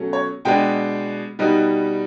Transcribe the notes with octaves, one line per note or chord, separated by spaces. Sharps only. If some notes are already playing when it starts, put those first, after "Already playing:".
Already playing: B2 F#3 A3 C#4
C#5
B2 G#3 B3 D4 G5
B2 G3 B3 D#4